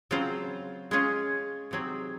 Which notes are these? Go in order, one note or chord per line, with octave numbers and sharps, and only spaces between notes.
C#3 F#3 C4 F4 C5
G#3 C#4 F4 G#4
C3 F#3 C4 D#4 G#4